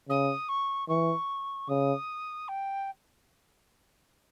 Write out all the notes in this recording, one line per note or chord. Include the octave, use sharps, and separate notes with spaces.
C#3 D#6
C#6
E3 C#6
C#3 D#6
G5